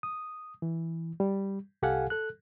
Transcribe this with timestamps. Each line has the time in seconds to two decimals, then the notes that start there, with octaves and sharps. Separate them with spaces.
0.03 D#6
0.62 E3
1.20 G3
1.82 C2 G4 A4 F5 F#5 G#5
2.10 A4 F#6